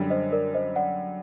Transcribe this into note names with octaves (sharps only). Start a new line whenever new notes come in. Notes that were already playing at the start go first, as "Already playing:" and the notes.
Already playing: F#2 D3 G3
C5 D#5
A#4 D5
C5 D#5
D5 F#5